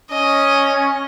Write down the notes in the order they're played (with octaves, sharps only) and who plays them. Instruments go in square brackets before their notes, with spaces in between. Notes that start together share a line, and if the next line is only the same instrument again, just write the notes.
[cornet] C#4 [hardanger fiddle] D#5